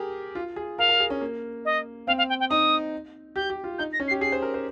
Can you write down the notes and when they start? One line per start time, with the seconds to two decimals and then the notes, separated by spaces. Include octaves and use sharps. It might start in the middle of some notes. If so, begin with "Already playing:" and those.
Already playing: G4 G#4 A#4
0.35 F4
0.56 G#4
0.78 A#4 F5
0.89 A#4
1.00 G#4
1.10 C#4
1.21 A#3
1.65 D#5
2.07 C4 F5
2.18 F5
2.29 G5
2.40 G5
2.49 D#4 D#6
3.36 G4 G6
3.50 G4
3.64 F4
3.78 D#4 G6
3.93 A#6
4.00 C#4
4.08 C7
4.11 G4
4.21 G#4 C7
4.32 C5
4.42 A#4
4.54 C5